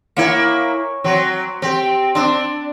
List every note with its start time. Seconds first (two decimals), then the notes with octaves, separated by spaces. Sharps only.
0.17 A#3 E4 C#5 G#5
1.04 F#3 C4
1.62 C4 G4
2.15 C4 D4 E6